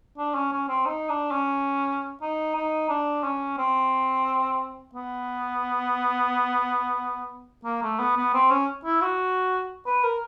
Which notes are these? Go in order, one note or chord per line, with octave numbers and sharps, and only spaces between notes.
D4
C#4
C#4
C4
D#4
D4
C#4
D#4
D#4
D4
C#4
C4
B3
A#3
A3
B3
B3
C4
C#4
E4
F#4
B4
A#4